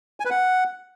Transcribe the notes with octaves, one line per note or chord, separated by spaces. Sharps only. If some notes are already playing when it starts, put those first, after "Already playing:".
G#5
B4
F#5